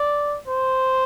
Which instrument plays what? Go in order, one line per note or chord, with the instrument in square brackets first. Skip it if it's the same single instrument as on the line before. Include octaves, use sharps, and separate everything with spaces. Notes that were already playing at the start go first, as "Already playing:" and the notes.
Already playing: [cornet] D5
C5